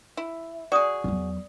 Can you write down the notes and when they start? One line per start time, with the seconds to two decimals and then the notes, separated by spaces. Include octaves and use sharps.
0.17 E4
0.72 F#4 G#4 D5 D#6
1.04 E2 F#3